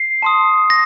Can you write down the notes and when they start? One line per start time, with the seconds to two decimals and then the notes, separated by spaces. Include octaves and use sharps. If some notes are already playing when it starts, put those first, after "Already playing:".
Already playing: C7
0.22 A5 C6 D#6
0.70 A#6